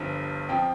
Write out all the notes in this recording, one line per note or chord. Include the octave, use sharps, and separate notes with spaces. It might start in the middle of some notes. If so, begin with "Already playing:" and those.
Already playing: G1 G2 D3 F3
F2 F3 G5